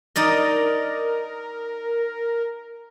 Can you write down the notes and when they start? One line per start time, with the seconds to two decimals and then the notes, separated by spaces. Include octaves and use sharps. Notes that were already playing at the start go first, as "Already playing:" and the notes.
0.16 D#4 A#4 D5 D#5